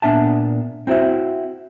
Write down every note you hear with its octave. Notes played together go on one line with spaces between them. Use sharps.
A#2 B3 D4 E5 A5
C4 E4 F#4 C5 E5